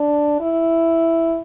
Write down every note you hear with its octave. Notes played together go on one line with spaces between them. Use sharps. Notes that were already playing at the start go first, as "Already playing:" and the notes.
Already playing: D4
E4